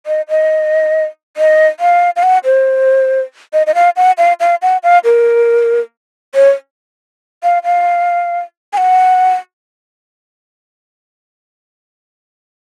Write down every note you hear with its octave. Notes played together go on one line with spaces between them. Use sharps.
D#5
D#5
D#5
F5
F5
F#5
C5
D#5
D#5
F5
F#5
F5
F5
F#5
F5
A#4
C#5
F5
F5
G#5
F#5